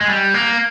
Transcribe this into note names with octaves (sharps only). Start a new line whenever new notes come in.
G#3
G3
A#3